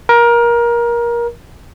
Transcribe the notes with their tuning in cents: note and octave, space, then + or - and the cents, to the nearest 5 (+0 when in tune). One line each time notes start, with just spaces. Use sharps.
A#4 +20